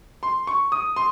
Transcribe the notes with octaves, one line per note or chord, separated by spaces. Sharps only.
C6
C#6
D#6
C6